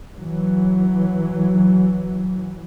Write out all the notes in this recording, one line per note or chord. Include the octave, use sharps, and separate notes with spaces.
E3 F#3